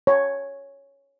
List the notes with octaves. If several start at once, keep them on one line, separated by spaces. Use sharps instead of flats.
C#5